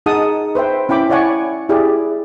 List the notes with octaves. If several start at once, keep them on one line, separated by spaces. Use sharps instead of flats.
D#4 G#4 F#5 A5 D#6
B4 C5 E5 G5
C#4 E4 G5 B5 D6
E4 C#5 D5 F#5 G#5 C#6
E4 G4 G#4 D5